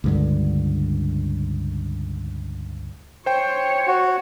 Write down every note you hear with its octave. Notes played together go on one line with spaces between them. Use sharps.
C#2 G2 D3
C5 C#5 G5
F#4